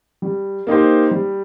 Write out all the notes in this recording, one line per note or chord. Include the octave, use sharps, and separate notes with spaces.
G3
A#3 D#4 G4 C5
G3